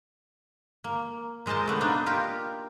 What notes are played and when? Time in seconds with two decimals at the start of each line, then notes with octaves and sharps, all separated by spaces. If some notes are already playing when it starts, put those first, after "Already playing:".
0.84 A#3
1.46 A#2 G#3 A#4 C5 A5
1.66 C3 A3 B3 D4
1.80 A#3 B3 D4 D#4
2.06 F4 G4 A#4